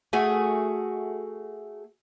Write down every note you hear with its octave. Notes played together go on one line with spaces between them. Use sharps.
A3 F#4 G#4